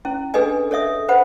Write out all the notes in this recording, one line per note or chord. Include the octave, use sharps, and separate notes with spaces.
C#4 E4
D4 G#4 A4 B4 D#5 G#5
A4 C#5 D#5 E5 D#6
B4 C5 F#5 B5